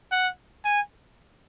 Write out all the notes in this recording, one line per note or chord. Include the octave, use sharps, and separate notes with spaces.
F#5
G#5